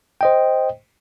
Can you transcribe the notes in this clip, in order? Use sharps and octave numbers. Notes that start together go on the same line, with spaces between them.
C5 D#5 G5